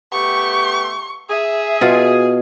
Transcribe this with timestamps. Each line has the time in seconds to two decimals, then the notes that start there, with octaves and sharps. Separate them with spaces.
0.13 A3 B3 G4 C#6
1.30 G#4 E5
1.81 B2 F4